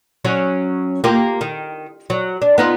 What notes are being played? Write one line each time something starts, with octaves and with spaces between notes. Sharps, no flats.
F#3 C#4 C#5
A#3 F4 G4
D#3
F#3
D4
B3 D#4 F4